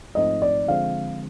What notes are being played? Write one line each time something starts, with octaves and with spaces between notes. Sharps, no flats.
G#2 F3 A3 C4 D#4 D#5
D5
D3 F3 G#3 C4 F5